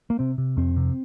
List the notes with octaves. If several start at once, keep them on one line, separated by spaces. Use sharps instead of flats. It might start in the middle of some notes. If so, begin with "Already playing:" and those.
A#3
C3 C4
C3
F2 C4
C3